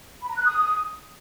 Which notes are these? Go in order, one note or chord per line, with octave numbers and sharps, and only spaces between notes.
B5
A#5
F#6
D#6